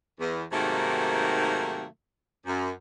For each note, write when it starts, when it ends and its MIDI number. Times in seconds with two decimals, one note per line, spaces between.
0.20 0.44 40
0.52 1.84 44
0.52 1.84 48
0.52 1.84 51
0.52 1.84 54
0.52 1.84 57
0.52 1.84 58
2.46 2.71 42